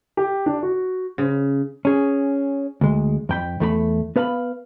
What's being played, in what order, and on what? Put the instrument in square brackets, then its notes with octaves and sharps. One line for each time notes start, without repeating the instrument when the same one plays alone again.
[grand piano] G4
D4
F#4
[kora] C#3
[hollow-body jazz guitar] C#4 G#4
D2 G#3
F2 G5 B5
E2 A3 F#4 B5
B3 B4 F5 A#5 B5